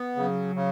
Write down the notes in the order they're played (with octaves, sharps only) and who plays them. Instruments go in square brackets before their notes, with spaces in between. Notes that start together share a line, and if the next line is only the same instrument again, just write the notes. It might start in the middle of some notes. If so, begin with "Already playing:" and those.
Already playing: [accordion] B3
[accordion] C#3 [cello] F#3
[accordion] C#3